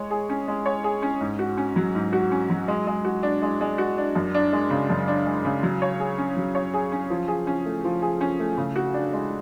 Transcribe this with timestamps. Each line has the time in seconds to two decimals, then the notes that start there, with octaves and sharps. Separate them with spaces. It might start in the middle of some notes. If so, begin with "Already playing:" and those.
Already playing: G#3 C#5
0.11 G#4
0.29 C#4
0.48 G#3
0.66 C#5
0.84 G#4
1.02 C#4
1.21 G#2
1.39 F#4
1.57 C#4
1.76 F#3
1.95 G#2
2.13 F#4
2.31 C#4
2.50 F#3
2.68 G#3
2.87 G#3
3.04 F#4
3.23 D4
3.42 G#3
3.61 G#3
3.78 F#4
3.98 D4
4.15 F#2
4.34 D4
4.53 G#3
4.70 C#3
4.90 F#2
5.08 D4
5.26 G#3
5.45 C#3
5.63 F#3
5.82 C#5
6.00 G#4
6.18 C#4
6.36 F#3
6.55 C#5
6.74 G#4
6.92 C#4
7.10 F3
7.28 G#4
7.47 C#4
7.66 A3
7.84 F3
8.02 G#4
8.21 C#4
8.39 A3
8.57 C#3
8.76 F#4
8.94 D4
9.13 G#3